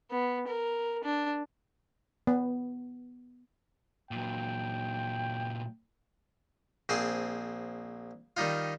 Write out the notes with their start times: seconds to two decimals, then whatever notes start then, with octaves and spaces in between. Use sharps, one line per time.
0.11 B3
0.48 A#4
1.04 D4
2.27 B3
4.11 A#2 F#3 G5
6.89 A#1 C4 G#4 C6
8.37 D#3 G3 D#4 F4